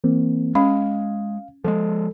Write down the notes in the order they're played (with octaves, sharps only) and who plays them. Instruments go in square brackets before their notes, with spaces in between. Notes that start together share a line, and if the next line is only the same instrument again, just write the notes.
[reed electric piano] E3 A#3 C4
[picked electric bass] G#3 [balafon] C#4 [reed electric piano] F5
[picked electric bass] F3 G3 G#3 [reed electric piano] A4